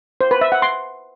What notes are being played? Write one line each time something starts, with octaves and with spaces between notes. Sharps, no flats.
C5
B4
E5
F#5
C6